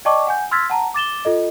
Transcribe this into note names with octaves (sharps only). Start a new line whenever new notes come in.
D5 D#5 G5 A5 C#6 D6
F#5 G#5 G6
C6 E6 F6 G#6 A6 B6
F#5 A5 A#5
D6 A6 E7 G7
F4 A4 D#5